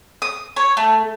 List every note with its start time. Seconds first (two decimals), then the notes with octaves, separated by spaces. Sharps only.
0.22 D#6
0.56 C#5
0.77 A3